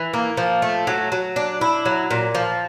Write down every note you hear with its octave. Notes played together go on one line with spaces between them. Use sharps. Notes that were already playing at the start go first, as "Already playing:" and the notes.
Already playing: E3
A#3
F3
A3
F#3
F#3
D4
E4
F#3
A#2
F3